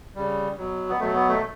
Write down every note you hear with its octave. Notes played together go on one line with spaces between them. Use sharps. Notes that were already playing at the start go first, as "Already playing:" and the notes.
C#3 G3
B2 F#3
B3
B2 F#3 A3
B3
A3